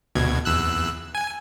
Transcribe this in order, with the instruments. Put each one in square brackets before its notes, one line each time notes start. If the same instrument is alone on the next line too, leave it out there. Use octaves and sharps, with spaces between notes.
[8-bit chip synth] D2 B2 G#6
E2 E6 F#6
G#5